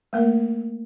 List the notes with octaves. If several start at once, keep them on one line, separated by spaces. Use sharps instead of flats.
A3 A#3 A#4